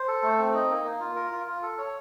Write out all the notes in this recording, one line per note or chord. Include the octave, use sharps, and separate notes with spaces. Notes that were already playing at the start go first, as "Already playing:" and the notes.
Already playing: C5
A4
A3
C4
D#4
A#3
A#3
F4
A#4
F4
F4
A4
C#5